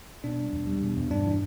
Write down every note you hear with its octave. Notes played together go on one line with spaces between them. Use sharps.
B2 D4
G3
E2
G3
B2
E2
G2 D4
E3